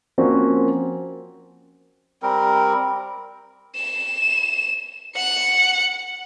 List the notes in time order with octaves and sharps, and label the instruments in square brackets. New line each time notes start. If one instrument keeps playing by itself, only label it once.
[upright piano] F3 A#3 C4 C#4 F#4
[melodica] G3 C4 A#4
[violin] E7
F#5 C#7